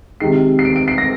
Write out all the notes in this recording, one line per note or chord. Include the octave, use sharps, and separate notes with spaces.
C3 D#3 G#3 C7
C7
D7
D7
C7
A#6